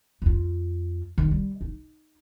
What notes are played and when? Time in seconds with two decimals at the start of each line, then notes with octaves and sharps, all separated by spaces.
0.22 F2 F4
1.18 D#3
1.31 G3
1.61 D#4